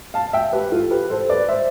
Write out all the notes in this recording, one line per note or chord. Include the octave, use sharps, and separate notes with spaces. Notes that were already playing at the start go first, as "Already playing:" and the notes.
F5 A5
E5 G5
G4 B4
F4 A4
G4 B4
A4 C5
B4 D5
C5 E5